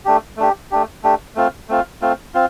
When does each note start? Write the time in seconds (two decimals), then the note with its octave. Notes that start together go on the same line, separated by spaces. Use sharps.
0.05 A3 D4 G4
0.37 A3 D4 G4
0.71 A3 D4 G4
1.03 A3 D4 G4
1.36 A3 C4 F4
1.69 A3 C4 F4
2.02 A3 C4 F4
2.34 C4 F4